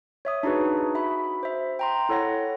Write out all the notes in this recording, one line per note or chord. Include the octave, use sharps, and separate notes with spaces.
C#5 E5 D#6
D4 D#4 F#4 G#4 B4
F#4 E5 B5
C5 E5
G5 A#5 C6
E4 A4 C#5 F#5 A#6